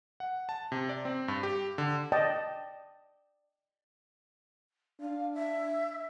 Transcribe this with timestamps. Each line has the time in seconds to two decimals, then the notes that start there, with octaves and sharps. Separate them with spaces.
0.20 F#5
0.49 A5
0.72 C3
0.89 D5
1.05 C4
1.28 G2
1.43 G4
1.78 D3
2.12 D5 D#5 G5 A5
5.01 D4 F5
5.34 E5